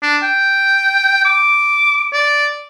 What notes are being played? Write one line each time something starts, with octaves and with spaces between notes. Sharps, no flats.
D4
G5
D6
D5